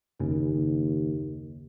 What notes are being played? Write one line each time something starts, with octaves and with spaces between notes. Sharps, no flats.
F#1 D#2 C#3